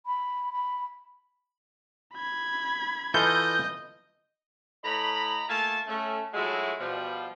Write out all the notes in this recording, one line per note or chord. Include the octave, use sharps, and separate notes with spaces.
B5
B5
B5 G#6
E3 F4 A4 D#5 G6
A2 D#5 A#5 B5
A3 A#3 F4 G#5 A5
A3 C#4
F3 F#3 G#3 A3 E4 F#4
B2 F3 G3